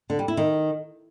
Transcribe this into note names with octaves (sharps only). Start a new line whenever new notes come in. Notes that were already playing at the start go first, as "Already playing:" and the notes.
D3
G3
E4
D#3